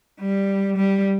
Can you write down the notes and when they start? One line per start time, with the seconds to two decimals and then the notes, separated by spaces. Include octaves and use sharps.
0.20 G3
0.77 G3